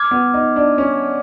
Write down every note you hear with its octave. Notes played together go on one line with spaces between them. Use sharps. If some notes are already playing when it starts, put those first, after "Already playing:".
Already playing: D6 F6 G#6
B3
D#4
D4
C#4